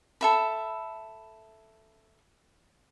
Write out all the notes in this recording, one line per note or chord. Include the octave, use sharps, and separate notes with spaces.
A4 E5 B5